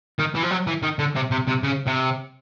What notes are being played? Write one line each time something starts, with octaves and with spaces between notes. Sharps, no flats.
D#3
E3
F3
F#3
E3
D#3
D3
C3
C3
C3
C#3
C3